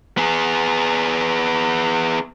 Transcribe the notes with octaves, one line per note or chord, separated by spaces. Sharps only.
B3 G#4